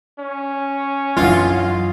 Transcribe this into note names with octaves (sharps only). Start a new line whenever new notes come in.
C#4
B1 F#2 D3 E3 F#3 F4